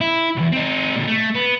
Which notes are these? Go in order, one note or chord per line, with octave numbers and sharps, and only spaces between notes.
E4
B1 E2
C4 D#4
A#2 D3
A3
B3